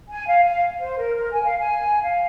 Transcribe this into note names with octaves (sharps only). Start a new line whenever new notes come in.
G#5
F5
F5
C5
A#4
A#4
G#5
F5
G#5
F5